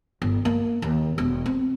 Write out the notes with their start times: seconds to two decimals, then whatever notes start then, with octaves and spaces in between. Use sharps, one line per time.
0.22 G1
0.45 A#3
0.82 D#2
1.18 E1
1.46 C4